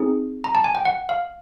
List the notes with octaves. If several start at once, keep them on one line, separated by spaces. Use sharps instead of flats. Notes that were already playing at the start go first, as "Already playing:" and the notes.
Already playing: C4 D#4 G#4
A#5
A5
G#5
G5
F#5
F5